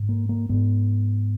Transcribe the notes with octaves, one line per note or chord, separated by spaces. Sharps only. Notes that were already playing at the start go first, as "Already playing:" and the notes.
Already playing: G#2
A#3
A#3
G#2 B3